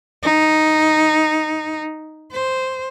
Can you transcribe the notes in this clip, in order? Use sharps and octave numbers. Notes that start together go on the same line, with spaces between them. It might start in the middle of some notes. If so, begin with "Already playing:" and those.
D#4
C5